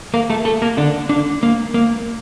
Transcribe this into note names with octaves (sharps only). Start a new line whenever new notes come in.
A#3 A#4
A3 A4
A3 A4
A#3 A#4
D3 D4
D3 D4
A#3
A#3